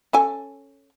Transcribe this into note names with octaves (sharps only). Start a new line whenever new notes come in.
C#4 A4 G#5